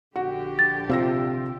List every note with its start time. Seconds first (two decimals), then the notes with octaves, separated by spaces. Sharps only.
0.16 A#1 D3 F#4 G4
0.59 A6
0.90 C3 F4 E6 A#6